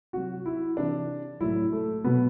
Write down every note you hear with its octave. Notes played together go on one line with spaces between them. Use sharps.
C3 F#3 F#4
E4
C3 E3 D4
A2 F#3 E4
A3
B2 F#3 B3